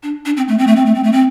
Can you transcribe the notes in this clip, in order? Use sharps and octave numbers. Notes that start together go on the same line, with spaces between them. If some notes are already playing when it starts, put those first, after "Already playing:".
D4
D4
C4
A3
C4
A3
C4
A3
C4
A3
C4